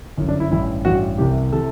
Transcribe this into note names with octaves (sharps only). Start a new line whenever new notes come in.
G1 F#2 E3
D4
E4
A1 G2 E3 E4
A1 G2 E3 F#4
C2 C3 E3 G4
C3 E3 A4